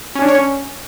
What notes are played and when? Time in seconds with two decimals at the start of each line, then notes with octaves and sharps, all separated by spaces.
0.15 C#4
0.22 D4
0.28 C#5
0.35 C#4